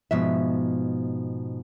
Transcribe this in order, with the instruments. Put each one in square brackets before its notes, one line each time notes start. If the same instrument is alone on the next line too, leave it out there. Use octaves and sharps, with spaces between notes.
[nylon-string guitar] G#2 B2 F3 E5